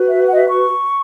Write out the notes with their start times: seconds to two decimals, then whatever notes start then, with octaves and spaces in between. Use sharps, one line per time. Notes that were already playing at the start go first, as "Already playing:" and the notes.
Already playing: F#4 B4
0.09 E5
0.26 F#5
0.33 D#5
0.36 E5
0.49 C#6